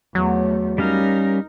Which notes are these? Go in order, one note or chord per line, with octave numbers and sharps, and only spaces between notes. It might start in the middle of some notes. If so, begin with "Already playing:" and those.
E2 F#3 A3
G3 C#4 D#4 A#4 F5